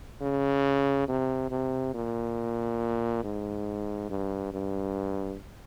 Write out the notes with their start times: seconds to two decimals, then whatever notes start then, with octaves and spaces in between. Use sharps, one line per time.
0.21 C#3
1.08 C3
1.51 C3
1.94 A#2
3.24 G#2
4.10 G2
4.53 G2